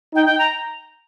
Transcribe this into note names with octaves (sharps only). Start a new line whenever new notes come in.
D#4 G5
G5
A#5